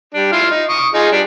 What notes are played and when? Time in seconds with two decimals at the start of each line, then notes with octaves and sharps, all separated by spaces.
0.14 G3 D4
0.32 E4 F4 F5
0.51 D#4
0.69 C#6 D#6
0.94 D#4 F4 G#4
1.12 G3 D4